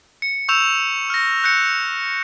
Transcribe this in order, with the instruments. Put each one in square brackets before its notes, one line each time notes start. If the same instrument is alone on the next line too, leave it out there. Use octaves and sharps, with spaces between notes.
[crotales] C#7
C#6 E6 G6 E7 F7
F6 A#6
F#6 G6 C#7